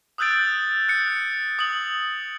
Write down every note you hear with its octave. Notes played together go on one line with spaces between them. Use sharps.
D#6 E6 F#6 G6 A6 D7
F#6 C#7
D#6 F#7